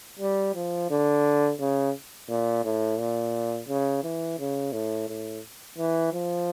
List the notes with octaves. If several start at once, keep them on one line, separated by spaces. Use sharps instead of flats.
G3
F3
D3
C#3
A#2
A2
A#2
C#3
E3
C#3
A2
A2
E3
F3